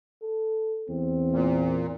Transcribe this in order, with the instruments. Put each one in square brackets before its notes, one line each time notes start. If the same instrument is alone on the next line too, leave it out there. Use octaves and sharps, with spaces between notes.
[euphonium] A4
[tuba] E2 [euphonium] C4
[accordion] A#2